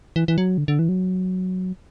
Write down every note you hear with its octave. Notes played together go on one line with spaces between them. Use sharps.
E3
E3
F#3
D3
D3
E3
F#3